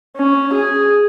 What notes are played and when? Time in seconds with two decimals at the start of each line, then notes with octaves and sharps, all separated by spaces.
0.16 C#4
0.53 G#4